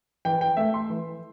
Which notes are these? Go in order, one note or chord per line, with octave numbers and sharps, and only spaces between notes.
E3 G5
G5
A3 E5
C6
E3